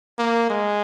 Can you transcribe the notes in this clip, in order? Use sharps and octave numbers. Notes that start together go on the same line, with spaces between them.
A#3
G#3